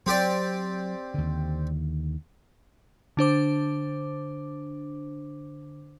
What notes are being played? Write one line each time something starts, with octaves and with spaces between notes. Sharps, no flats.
F#3 C4 G4 D5
D#2 D3
D3 D4 C5 D6